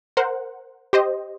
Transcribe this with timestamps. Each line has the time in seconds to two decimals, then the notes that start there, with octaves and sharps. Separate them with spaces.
0.17 A#4 C5 F#5
0.93 G4 C5 D#5